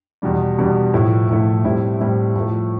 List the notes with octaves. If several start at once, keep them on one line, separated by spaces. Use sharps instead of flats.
E2 B2 G3 D4
E2 B2 G3 D4
A2 F3 A3 E4
A2 F3 A3 E4
A2 G3 C4 E4
A2 G3 C4 E4
A2 F3 A3